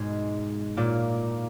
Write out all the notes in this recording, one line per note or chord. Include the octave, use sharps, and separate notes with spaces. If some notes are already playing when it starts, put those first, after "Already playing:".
Already playing: G#2 B2 G#3
A#2 A#3